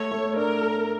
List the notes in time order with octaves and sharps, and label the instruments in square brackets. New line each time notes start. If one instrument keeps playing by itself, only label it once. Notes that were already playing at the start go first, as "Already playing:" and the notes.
Already playing: [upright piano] A3 [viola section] C#5
[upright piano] A3
[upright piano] D4 [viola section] A#4
[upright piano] A4